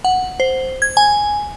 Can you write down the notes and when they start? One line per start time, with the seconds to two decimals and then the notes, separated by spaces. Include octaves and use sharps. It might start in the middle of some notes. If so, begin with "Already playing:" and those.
0.05 F#5
0.40 C5
0.82 G#6
0.97 G#5